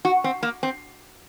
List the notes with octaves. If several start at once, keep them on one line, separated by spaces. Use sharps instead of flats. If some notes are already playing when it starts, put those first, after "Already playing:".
F#4
C4
A#3
C4